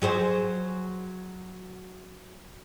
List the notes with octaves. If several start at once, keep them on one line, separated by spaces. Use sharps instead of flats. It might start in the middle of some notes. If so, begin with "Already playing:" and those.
F#3 G#4 C5